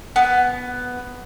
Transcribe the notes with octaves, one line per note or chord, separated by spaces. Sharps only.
B3